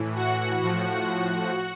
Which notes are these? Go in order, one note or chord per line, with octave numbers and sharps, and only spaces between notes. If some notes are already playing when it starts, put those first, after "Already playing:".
Already playing: A2 E3
F#4 F#5
A2 F3